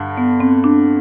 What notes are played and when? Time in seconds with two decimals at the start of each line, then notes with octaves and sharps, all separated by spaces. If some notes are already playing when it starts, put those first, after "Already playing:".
Already playing: G2 D3
0.17 B3
0.40 C4
0.64 D4